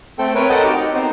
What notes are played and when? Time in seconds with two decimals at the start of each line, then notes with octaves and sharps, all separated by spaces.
0.19 A3 C4 A4 G5
0.35 C4 A#4 B4 C#5 G5
0.50 A4 A#4 D#5 F#5 G5 A5
0.64 D#4 F#4 G4
0.77 D#4
0.94 B3 C4 D#4 C5